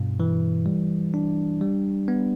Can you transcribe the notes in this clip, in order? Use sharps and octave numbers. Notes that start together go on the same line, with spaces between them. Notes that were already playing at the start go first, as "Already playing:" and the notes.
Already playing: G2 B2
E3
G3
D4
G3
B3